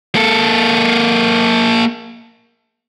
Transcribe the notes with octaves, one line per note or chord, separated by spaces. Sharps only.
A#3 A4